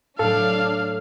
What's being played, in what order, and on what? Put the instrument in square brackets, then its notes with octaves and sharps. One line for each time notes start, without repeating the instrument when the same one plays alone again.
[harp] A2 F#3 [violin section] D4 [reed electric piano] A4 [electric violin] F5